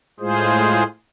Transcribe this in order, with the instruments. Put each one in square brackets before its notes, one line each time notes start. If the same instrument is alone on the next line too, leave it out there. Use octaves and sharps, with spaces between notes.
[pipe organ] A2 G#3 F4 G#4 C5